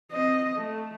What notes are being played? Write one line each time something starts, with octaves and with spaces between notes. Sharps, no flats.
C4 D#5
A3